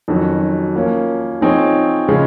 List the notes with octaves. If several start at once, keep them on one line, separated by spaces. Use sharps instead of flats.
F2 D#3 F#3 C#4 F#4
F3 A#3 C#4
F3 C4 D#4 G#4 C#5
C#3 F3 G#3 C#4